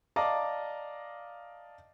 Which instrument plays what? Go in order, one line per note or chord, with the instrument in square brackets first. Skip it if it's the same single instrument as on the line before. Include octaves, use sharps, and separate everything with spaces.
[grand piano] D5 D#5 F5 A5 A#5 D6